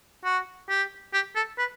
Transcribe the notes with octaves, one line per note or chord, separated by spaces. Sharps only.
F#4
G4
G4
A4
B4